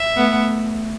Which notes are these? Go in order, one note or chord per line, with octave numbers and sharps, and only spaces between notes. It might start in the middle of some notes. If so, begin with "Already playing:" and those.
Already playing: E5
A3 B3